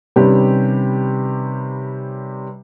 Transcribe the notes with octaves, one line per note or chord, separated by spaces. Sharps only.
C3 D#3 G3 C#4 G4 B4